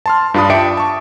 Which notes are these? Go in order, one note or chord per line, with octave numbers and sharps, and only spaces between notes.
A5 C6 F6
G2 D4 F4 A5 B5 D#6
E5 G5 A5 D6 C#7 D7
A5 C#6